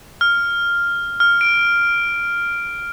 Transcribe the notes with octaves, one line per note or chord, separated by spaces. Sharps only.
F6
F6
D7